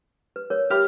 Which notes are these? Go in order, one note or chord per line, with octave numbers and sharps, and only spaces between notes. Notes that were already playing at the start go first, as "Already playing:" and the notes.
B4
A#4 C#5
G4 A#4 E5 B5 F6